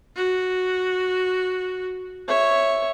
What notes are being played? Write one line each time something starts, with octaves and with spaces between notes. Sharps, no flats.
F#4
C#5 E5